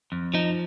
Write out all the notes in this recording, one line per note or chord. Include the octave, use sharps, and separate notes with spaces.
F2
F3 D#4